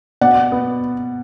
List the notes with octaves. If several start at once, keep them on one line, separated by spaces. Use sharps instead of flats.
B2 D5 F#5
B3